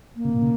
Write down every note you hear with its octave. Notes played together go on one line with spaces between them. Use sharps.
A#3
C#3
A#2
C#3